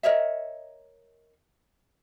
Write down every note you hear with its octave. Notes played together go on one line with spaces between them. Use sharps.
A#4 C#5 D#5 E5